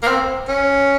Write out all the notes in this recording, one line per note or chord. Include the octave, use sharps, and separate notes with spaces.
A#3
C4
C#4